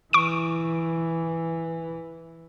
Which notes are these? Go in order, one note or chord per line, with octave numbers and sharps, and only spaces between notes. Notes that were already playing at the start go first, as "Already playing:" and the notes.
E3 C#6 D7